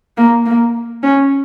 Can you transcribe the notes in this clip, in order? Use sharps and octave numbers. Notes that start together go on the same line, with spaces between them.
A#3
A#3
C#4